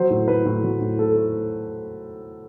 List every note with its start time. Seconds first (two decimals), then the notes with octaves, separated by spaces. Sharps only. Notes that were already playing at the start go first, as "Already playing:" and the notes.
Already playing: F#3 C5
0.10 A2
0.28 A2 B4
0.45 A2
0.63 F#3
0.81 A2
0.99 A3 A4
1.16 A3